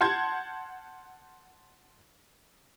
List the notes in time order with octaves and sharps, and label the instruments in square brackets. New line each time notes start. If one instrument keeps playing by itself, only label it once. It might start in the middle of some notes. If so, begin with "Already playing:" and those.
[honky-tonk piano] F#5 A5 C6 G6 G#6